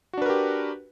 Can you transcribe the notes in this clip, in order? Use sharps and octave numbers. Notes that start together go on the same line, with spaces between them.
D4 F#4 G4 A#4 B4